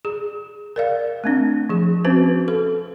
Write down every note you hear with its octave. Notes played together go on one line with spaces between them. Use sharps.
G#4
A#4 D5 F5
A3 C4 D4
F3 G#4
C4 C#4 F#4 B4 C5
A4